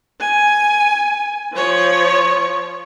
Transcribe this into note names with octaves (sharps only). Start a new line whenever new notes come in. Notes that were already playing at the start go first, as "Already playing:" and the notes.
G#5
F3 C#5